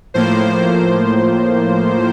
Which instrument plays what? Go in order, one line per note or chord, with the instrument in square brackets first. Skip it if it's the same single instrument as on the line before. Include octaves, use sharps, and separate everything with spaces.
[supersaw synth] A2 F3 A#3 C5